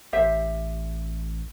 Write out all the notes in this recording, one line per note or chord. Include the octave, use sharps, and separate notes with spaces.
A1 G4 C5 E5